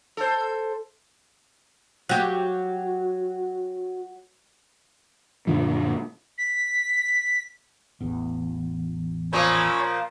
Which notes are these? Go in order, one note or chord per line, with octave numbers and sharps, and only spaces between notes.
A4 C5
F#3 F#4 G4
F#2 A#2 D3 F3
B6
A1 E2
A#2 F3 A#3 C#4 C#5 B5